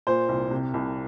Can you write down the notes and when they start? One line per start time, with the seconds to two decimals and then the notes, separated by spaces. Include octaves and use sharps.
0.07 A#2 C5
0.29 C2
0.51 C3
0.74 C2